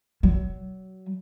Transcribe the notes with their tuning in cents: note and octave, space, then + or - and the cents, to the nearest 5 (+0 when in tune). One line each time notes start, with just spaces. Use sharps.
F#3 +25